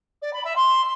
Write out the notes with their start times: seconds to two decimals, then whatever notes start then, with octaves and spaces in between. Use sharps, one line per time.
0.21 D5
0.33 B5
0.44 E5
0.55 C6